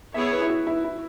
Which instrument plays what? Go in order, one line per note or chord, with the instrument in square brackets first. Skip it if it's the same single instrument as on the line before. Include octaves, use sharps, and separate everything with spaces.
[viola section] B3 E4 G#4 C#5 [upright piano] E5
[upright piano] B4
E4
F#4
E4
E4